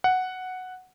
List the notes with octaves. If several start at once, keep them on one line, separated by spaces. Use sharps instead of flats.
F#5